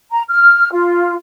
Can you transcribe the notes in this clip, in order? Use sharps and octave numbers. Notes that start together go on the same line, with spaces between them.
A#5
F6
F4